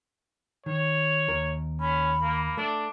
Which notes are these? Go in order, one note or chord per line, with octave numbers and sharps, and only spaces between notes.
D#3 C#5
D#2 A#4
C#4 B5
A#3
A3 D4